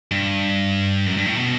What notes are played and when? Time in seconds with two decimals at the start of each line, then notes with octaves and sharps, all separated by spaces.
0.11 G2
1.06 F#2
1.17 G2
1.26 A2
1.36 B2